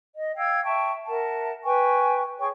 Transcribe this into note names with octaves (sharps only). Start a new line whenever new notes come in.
D#5
F5 G5 E6 G#6
E5 G5 A5 C#6
A#4 E5 F#5 A5
B4 G5 G#5 C#6
G#4 C#5 G5 C#6